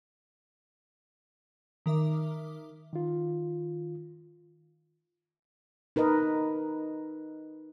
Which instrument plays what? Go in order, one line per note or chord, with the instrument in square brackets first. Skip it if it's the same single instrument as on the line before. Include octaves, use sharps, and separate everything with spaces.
[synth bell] D#3 A#4 E5 D6
[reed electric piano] D#3 F4
[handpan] D#4 A#4 B4 D#5